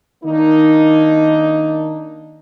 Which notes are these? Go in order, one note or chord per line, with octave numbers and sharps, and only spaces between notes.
D#3 A#3 D4 D#4